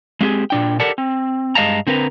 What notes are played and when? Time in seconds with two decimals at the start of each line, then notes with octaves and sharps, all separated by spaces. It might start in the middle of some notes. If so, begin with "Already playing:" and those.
0.21 G#3 C4 G4 G#4
0.50 A#2 D4 G5
0.80 G4 A4 A#4 D5 F#5 A5
0.98 C4
1.55 G2 G#3 D#5 F5 A5 A#5
1.87 D3 C4 A#4 B4 A#5